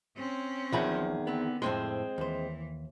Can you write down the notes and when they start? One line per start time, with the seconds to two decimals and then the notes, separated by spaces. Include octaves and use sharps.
0.17 C4 C#4
0.72 B1 E2 D#3 F3 G#4 B5
1.27 D3 B3 C4
1.62 F2 A2 G#3 C4 C6
2.18 D#2 E3 C5